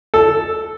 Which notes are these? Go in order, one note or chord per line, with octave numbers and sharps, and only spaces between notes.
A4